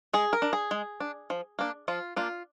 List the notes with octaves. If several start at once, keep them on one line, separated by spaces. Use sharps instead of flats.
G#3 G#4
A#4
D4
G#4
G#3
D4
F3
A#3 D4
F3 F4
A#3 D4 F4